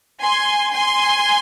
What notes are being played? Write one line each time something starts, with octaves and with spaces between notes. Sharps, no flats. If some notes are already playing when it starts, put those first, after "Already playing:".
G#5 C6
G#5 C6